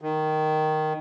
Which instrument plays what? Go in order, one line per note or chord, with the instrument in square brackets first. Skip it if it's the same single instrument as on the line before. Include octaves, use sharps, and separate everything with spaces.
[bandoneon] D#3